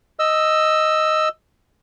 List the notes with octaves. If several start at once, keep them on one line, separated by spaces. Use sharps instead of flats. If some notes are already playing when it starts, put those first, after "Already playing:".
D#5 E6